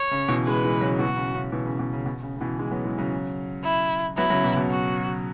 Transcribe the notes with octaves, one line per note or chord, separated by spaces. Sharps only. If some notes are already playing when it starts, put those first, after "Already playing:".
Already playing: C#5
C#3
B2 E3
E3 G#3 B4
E3 G#3
C#3 F#3
B2 E3 F#4
B2
C#3
C#3
B2 E3
C#3
B2
C#3
B2
C#3
C#3
B2 E3
E3 G#3
F#3 B3
E3 G#3
C#3 F#3
E4
F#3 B3 E4
C#3 F#3
B2
B2
F#4